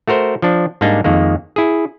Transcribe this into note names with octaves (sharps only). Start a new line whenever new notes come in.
A3 F#4 A#4 C5
F3 D4
G#2 G3 A#3 D4 D#4
F2 D#3 G#3 A#3
E4 G#4